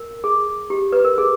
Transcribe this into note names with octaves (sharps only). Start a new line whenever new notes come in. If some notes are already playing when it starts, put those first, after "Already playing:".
Already playing: A#4
G#4
G4
B4
A#4
G#4